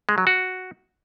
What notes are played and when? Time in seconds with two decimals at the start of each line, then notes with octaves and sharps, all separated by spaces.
0.09 G#3
0.18 F#3
0.27 F#4